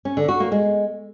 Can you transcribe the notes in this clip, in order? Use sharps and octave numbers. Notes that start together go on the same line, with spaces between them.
C#4
D3
F#4
A#3
G#3